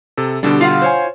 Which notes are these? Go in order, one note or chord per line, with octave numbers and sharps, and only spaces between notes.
C3 A4
B2 D3 G3 D4 G4
F4 F5 F#5
C5 C#5 G#5